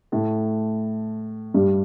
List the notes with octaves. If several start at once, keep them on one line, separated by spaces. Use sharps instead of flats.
A2 A3
G2 G3